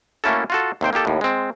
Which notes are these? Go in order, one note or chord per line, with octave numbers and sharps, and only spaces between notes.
A3 A#3 C#4 E4 F#4 A4
F4 F#4 A4
D#2 C3 C5 G5
A#3 D#4 G4 A4
D#2 A2
G#3 C4